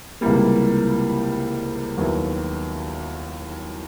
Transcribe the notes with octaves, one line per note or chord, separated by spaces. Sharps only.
C#2 C3 E3 G3 A#3
D#2 D#3 F#3 B3 E4